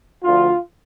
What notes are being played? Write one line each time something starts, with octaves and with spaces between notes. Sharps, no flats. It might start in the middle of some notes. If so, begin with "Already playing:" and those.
D2 D3 F3 F4